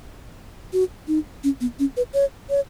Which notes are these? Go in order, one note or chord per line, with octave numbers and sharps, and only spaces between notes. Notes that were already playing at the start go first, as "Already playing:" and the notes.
F#4
D#4
C#4
B3
C#4
B4
C#5
C#5